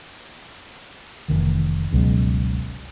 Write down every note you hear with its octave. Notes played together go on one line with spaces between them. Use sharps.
F1 D2 D#3 E3
G1 C#2 B2 F#3